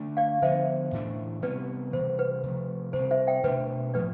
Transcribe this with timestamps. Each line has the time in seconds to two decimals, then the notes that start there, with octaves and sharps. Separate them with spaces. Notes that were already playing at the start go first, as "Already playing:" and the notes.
Already playing: D3 A3 D4
0.17 D5 F5
0.42 D3 F3 B3 C5 E5
0.92 A2 E3 A3 D4
1.42 C3 G3 B3 B4 D5
1.93 C3 E3 G3 C5
2.19 B4
2.43 C3 F3 A3
2.93 C3 G3 C4 C5
3.11 C5 E5
3.27 E5 G5
3.43 B2 A3 D4 B4
3.94 A2 F3 A3 B4 D5